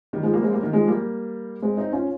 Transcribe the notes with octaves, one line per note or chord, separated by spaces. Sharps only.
D#3 G3
F3 G#3
G3 A#3
G#3 C4
G3 A#3
D#3 G3
F3 G#3
G3 A#3
G#3 C4
C4 D#4
C#4 F4